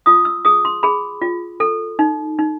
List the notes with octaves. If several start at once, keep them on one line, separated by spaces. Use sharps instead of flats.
F4 D#6
E6
G#4 D#6
C6
G#4 B5
F4
A4
D#4
D#4